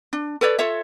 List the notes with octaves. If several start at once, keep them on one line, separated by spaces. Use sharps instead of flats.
D4
A4 B4 C#5 D5
F4 A4 C#5 E5